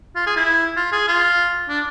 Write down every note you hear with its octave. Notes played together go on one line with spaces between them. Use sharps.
F4
G#4
E4
F4
G#4
F4
D4